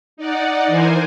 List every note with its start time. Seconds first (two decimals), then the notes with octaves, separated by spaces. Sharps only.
0.17 D#4 D5 F#5
0.67 E3 A#4 C5 G#5